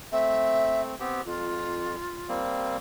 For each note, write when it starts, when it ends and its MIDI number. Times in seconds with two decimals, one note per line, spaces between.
0.12 0.95 57
0.12 0.95 60
0.12 0.81 76
1.00 1.21 59
1.00 1.21 60
1.00 1.21 67
1.26 1.96 41
1.26 2.37 65
2.29 2.77 55
2.29 2.77 58
2.29 2.77 60